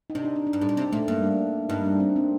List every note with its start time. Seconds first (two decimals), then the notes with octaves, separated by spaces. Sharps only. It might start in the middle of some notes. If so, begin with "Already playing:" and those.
0.10 D#4
0.15 C3 D4
0.25 D#4
0.36 D4
0.47 D4
0.53 G2
0.61 A2 D4
0.69 A#2
0.77 C3 C4
0.92 A#2 A3
1.08 G2 A#3
1.24 D4
1.69 G2 D#4
1.85 D4
2.00 C4
2.16 C4